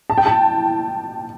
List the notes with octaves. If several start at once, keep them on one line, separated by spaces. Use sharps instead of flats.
A5
G5
A5